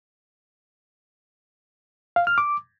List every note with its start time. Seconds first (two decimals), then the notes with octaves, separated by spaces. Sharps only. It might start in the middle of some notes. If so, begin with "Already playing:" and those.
2.16 F5
2.27 F6
2.38 D6